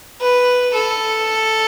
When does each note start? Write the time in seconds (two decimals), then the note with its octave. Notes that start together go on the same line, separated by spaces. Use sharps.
0.21 B4
0.75 A4